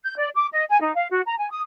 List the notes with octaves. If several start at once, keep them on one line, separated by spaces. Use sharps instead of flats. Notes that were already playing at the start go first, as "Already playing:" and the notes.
G6
D5
D6
D#5
G#5
D#4
F5
F#4
A#5
G#5
D#6